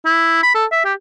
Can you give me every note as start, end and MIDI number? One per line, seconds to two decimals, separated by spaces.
0.06 0.40 64
0.43 0.54 83
0.55 0.65 69
0.72 0.81 76
0.85 0.93 67